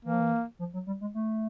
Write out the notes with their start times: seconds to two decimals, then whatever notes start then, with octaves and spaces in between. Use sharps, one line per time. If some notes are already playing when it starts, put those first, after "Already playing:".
0.05 E3 A#3
0.13 F3
0.20 E3
0.59 F3
0.74 F#3
0.87 G3
1.01 G#3
1.14 A3